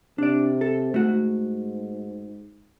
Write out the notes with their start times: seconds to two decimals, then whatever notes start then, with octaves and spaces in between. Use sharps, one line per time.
0.18 C3 D4 D5
0.61 A4
0.94 G#2 A3 F#4